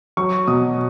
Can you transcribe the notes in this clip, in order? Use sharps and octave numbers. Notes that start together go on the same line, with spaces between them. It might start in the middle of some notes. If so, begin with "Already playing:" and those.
F#3 C#6
B2 D#6